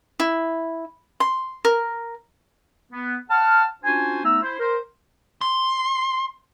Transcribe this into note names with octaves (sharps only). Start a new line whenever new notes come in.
E4
C6
A#4
B3
F#5 A5 F6
C#4 D4 F4 F#4 C5 G#5
A3 B3 D#4 A#5 E6
E4 C5
A#4 C5
C6